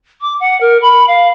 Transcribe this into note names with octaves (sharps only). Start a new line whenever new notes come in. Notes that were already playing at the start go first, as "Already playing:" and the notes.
D6
F#5
A#4
B5
F5